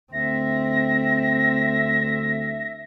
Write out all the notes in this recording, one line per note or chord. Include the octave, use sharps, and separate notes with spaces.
D2 C4 E5 A#6